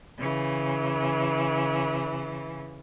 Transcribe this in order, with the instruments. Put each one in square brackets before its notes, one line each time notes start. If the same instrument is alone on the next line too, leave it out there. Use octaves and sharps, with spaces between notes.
[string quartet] C#3 E3